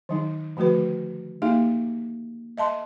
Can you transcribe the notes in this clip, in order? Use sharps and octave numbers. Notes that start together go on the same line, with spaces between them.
D#3 F#3 D#4
D3 F3 A3 F#4 B4
A#3 D#4 G4 E5 F5
D#5 E5 A5 C6